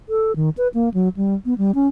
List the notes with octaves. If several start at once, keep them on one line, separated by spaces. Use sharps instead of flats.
A4
D#3
B4
A#3
F#3
G3
B3
G3
C#4